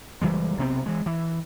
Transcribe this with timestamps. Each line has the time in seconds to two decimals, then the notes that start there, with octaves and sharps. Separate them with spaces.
0.21 F#1 E3 G3 G#3
0.57 B1 C3 B3 C4
0.86 E3 G#3
1.06 E3